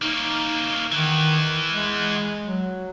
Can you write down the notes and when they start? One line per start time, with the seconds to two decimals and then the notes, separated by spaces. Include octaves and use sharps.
0.02 A#3 C#4 D#4
0.92 D#3 E3 B3
1.71 G#3
2.42 F#3